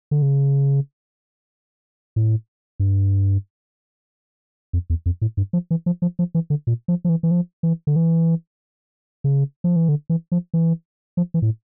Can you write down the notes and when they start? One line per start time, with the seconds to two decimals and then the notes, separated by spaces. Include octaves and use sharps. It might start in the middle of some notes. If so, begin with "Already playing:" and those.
0.11 D3
0.22 C#3
2.16 A2
2.80 G2
4.73 F2
4.90 E2
5.06 F2
5.22 A2
5.37 G2
5.53 F3
5.71 E3
5.86 F3
6.02 F3
6.19 F3
6.35 E3
6.50 D3
6.67 A#2
6.88 F3
7.05 F3
7.09 E3
7.23 E3
7.31 F3
7.63 E3
7.87 D3
7.96 E3
9.24 C#3
9.64 F3
9.76 E3
9.89 D3
10.10 E3
10.32 F3
10.54 E3
11.17 F3
11.34 E3
11.42 A2